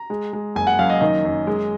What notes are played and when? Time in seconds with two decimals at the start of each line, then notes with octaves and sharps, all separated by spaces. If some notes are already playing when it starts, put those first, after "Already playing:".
Already playing: A#5
0.10 G#3
0.33 G#3
0.55 F#1 G#5
0.67 F#5
0.79 F#2 F5
0.90 D#5
1.01 D#3 D#5
1.25 F#2
1.47 G#3